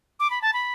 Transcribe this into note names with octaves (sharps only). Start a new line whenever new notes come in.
D6
B5
A5
B5